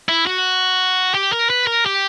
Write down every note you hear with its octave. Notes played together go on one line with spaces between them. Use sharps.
E4
F#4
G4
A#4
B4
A#4
G4